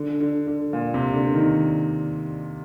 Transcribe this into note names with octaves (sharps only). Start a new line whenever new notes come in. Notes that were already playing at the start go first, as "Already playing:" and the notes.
Already playing: D3
D3
D3
A#2
C3
D3
D#3